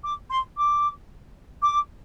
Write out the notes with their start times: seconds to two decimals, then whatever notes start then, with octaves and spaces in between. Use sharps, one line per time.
0.04 D6
0.30 C6
0.57 D6
1.62 D6